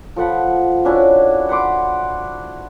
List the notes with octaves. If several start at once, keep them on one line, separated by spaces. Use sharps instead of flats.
F3 A4 F#5 B5
C#4 D4 E4 F#4
F#5 B5 C6 D6